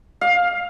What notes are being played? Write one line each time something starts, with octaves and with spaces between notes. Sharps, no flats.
F5